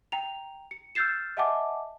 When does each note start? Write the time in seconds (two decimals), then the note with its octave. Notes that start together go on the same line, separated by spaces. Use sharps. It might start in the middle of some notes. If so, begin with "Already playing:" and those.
0.12 G5 A#5 F7
0.71 C#7
0.95 E6 F6 G6 A6 C7 E7
1.37 D#5 E5 F#5 G#5 A5 D6